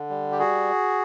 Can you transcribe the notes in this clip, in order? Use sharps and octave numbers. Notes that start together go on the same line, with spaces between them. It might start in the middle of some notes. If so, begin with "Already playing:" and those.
Already playing: D3
G3
G4
F#4 G#4